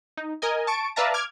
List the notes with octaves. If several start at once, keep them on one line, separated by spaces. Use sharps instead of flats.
D#4
A#4 D#5 G#5
A5 C#6 D7
B4 D5 E5 F5 A5 A#5
D6 F6 G#6